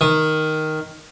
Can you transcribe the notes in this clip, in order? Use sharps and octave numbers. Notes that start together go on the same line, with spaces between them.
D#3